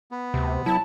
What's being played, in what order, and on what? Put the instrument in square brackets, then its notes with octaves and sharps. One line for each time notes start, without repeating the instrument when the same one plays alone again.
[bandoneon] B3
[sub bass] D2 [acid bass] C3
[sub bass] F#3 [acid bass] E4 [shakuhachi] A5